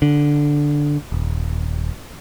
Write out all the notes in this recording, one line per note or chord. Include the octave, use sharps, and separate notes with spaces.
D3
D#1